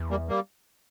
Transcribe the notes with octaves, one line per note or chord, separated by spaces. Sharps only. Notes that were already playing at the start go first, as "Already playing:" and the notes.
Already playing: E2
G3 A#3
G3 A#3